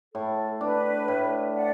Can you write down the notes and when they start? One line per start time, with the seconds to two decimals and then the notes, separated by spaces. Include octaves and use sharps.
0.14 A2 A4
0.61 D4 B4
1.08 A2
1.55 D5 F#5